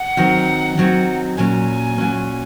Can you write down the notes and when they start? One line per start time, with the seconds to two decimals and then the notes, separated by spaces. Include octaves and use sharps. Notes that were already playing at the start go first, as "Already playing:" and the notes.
Already playing: F#5
0.17 D#3 F#3 C4
0.77 D#3 F#3 C4
1.37 A#2 F#3 C#4 G#5
1.98 A#2 F#3 C#4